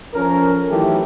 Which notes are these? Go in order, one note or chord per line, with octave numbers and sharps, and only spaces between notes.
F3 C#4 A4 A#4
D#3 E3 F#3 A3 G4 A4